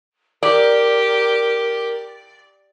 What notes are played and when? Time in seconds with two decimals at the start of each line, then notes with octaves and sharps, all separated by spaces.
0.43 G4 A#4 D5